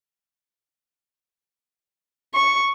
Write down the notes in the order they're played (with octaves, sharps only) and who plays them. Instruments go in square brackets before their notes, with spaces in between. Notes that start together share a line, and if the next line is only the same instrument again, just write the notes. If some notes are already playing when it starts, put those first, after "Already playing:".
[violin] C#6